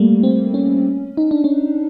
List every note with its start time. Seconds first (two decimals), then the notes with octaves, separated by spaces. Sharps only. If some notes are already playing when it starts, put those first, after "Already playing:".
Already playing: G3 A3 A#3
0.23 C4
0.54 C#4
1.17 D#4
1.31 D4
1.44 C#4